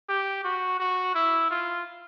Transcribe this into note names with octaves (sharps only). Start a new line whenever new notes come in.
G4
F#4
F#4
E4
F4